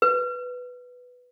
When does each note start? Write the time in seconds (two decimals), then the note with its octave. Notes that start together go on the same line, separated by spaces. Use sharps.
0.02 B4